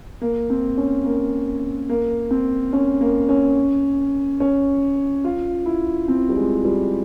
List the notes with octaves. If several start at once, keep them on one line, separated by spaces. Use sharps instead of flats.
A#3
C4
C#4
A#3
A#3
C4
C#4
A#3
C#4
C#4
F4
E4
C4
G3
G#3
G3